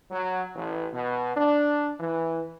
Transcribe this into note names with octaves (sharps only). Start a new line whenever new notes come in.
F#3
A1
B2
D4
E3